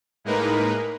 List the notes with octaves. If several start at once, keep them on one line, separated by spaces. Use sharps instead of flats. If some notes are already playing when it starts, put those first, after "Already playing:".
A2 G#3 A#3 D#4 A#4 B4